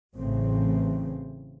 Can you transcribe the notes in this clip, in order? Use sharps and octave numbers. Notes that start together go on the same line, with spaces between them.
A1 A2 C#3 E3 C4